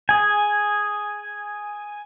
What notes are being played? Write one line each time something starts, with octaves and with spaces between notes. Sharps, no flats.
G#4 G#5